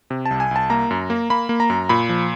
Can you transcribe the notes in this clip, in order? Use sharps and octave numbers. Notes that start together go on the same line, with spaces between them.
C3
A5
C2
G#5
C2 A5
A#3 A#5
F#2
A#3
A#3 B5
A#3
A#5
F#2
A#2 B5
F3